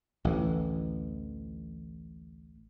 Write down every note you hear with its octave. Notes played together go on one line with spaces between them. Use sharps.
A1 D2 E3